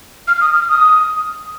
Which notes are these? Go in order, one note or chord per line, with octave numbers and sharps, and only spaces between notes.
F6
D#6
F6
D#6